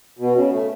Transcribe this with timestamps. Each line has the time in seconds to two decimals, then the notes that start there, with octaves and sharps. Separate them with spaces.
0.19 B2
0.35 C#3
0.52 A3